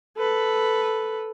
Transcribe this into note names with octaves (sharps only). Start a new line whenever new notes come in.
A4 B4